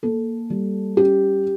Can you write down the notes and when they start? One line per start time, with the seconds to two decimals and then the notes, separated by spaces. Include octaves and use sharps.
0.03 A#3 A4
0.50 G3
0.97 C#4 G4